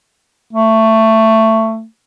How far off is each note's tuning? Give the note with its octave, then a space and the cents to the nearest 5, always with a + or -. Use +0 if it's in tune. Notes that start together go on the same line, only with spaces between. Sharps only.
A3 +15